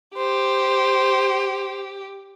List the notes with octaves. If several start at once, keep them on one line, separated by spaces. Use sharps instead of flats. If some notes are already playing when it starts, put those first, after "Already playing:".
G4 C5